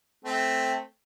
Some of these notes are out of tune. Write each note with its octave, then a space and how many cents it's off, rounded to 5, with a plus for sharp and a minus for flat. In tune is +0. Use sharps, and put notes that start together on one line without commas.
A3 -5 C4 +0